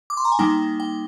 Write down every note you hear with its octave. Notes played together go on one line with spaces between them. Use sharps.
D6
C6
A#5
G#5
G3 A#3 D#4 G5
G5